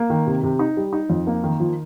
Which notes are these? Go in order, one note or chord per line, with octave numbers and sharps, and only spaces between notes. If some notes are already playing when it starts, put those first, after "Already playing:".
Already playing: A#3
D#3
C3
C3
D#4
G3
D#4
F2
A#3
D#3
F3